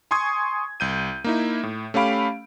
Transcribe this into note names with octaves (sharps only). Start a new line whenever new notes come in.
G#5 C6 C#6 D#6 G#6
C2 G6 D#7
A#3 D#4 E4
A2
A3 C#4 G4 F5 B5 D7